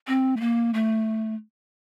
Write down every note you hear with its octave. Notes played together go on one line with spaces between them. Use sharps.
C4
A3
A#3
A3